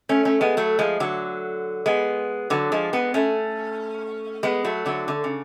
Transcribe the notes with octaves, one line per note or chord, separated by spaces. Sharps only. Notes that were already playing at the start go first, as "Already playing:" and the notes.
A3 C#4
A3 C#4
G#3 B3
F#3 A3
F3 G#3
D3 F#3
G#3 B3
D3 F#3
F3 G#3
G#3 B3
A3 C#4
G#3 B3
F#3 A3
D3 F#3
D3
C#3